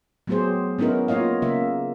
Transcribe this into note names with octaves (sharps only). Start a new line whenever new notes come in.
F#3 A3 B3 G4 G#4 C5
B3 C#4 D#4 E4 A#4
A#3 F4 C#5 D#5 F5
C#3 A#3 E5